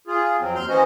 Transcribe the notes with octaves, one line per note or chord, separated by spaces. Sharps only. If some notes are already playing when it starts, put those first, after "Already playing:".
F4 G#4
F2 F#3 C4
D#2 C6 F6 G6
E3 C#4 F#4 C5 D#5